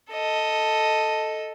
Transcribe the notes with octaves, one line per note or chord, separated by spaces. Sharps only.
A4 D#5